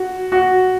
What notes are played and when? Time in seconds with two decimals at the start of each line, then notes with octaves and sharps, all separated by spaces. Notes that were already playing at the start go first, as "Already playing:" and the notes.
Already playing: F#4
0.32 F#4